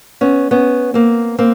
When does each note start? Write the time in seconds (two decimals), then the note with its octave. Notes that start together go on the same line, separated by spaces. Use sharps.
0.21 B3 C#4
0.51 B3 C#4
0.94 A#3 C4
1.38 A#3 C4